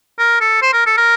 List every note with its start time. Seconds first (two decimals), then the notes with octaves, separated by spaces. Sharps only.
0.19 A#4
0.41 A4
0.62 C5
0.73 A#4
0.86 A4
0.98 A#4